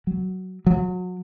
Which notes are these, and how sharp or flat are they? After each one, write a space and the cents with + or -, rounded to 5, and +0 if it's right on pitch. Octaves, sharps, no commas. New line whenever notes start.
F#3 +10
F#3 -30